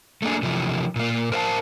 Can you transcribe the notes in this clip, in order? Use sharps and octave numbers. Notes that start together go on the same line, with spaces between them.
A3 A#3 D4 G#4
C3 E3 F3
A#2 A#3
A#4 C5 E5 F5 A5